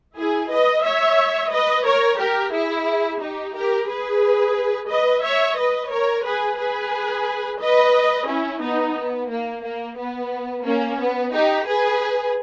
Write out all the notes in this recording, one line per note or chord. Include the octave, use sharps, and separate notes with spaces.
E4 G#4
B4 D#5
C#5 E5
B4 D#5
A#4 C#5
G4 A#4
E4 G#4
D#4 G4
G4 A#4
G#4 B4
B4 D#5
C#5 E5
B4 D#5
A#4 C#5
G#4 B4
G#4 B4
B4 D#5
C#4 E4
B3 D#4
B3
A#3
A#3
B3
A#3 C#4
B3
D#4 G4
G#4 B4